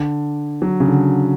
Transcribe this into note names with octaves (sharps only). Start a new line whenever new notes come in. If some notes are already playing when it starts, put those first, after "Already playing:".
Already playing: D3
F#3
C#3
D3